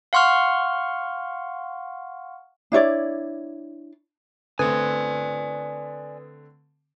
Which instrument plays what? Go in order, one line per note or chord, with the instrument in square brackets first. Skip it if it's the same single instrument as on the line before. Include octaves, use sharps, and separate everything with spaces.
[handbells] F5 F#5 C6 C#6 F6
[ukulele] D4 E4 C#5 D5
[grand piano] D3 A3 C4 [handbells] B4 D#6 G#6 [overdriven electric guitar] D5 G#5